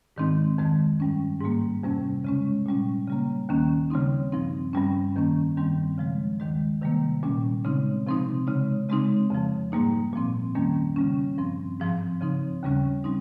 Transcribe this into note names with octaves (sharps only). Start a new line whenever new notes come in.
G#2 D#3 G#3 C4 D#4
F2 D#3 G#3
G2 G3 C#4
G#2 G3 A#3
F2 C3 G3 C#4
C#3 G#3 C#4
A#2 G3 C#4
C#3 G3 A#3
D#2 D#3 A#3 C#4
C#3 G3 C4 D#4
G2 F3 C4 D#4
G2 G3 C#4
F2 D#3 A#3 C#4
G2 D#3 G3 C4
C#3 F3 G#3
D#2 D#3 G#3
C3 D#3 G3 A#3
A#2 G3 C#4
C#3 G#3 C4 D#4
C3 F3 C4 D#4
C#3 G#3 D#4
C#3 G#3 C4 D#4
F2 C#3 F3
G#2 G3 A#3 D#4
A#2 F3 C4
F2 D#3 G3 A#3 C#4
C#3 G3 C#4
G2 F3 C4
G#2 F3 C4
C#3 F3 C4 D#4
D#2 C#3 G3 C#4
G3 C4 D#4